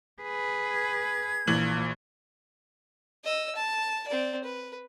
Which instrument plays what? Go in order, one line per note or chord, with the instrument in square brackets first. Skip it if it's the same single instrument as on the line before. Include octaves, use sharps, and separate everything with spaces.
[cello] G#4 B4
[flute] G#6
[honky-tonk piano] A#1 E3 F#7 [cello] A#2
[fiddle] D#5 E6
A5
C4 D5
B4